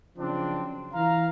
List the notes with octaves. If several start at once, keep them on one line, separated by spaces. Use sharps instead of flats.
C#3 F3 F#3 C4 D4
E3 F5 A#5